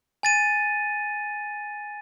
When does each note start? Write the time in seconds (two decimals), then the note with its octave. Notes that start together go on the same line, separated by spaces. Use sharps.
0.23 G#5 A6 D#7